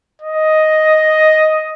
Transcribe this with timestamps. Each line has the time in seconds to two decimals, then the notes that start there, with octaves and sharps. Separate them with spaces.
0.22 D#5